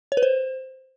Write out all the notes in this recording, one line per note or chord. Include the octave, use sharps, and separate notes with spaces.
C#5
B4
C5